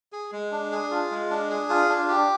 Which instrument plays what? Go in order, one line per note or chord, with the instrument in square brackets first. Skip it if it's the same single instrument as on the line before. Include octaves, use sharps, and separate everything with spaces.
[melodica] G#4
G#3
D4
G#4
F4
G#3
D4
G#4
F4
D4
G4